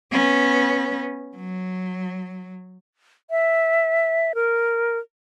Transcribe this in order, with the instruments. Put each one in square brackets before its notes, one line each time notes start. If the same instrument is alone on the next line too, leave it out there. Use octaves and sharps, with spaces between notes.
[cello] B3 C#4
F#3
[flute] E5
A#4